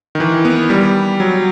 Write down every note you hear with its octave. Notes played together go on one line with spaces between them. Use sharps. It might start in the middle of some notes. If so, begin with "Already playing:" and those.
D#3
E3
B3
G3
F#3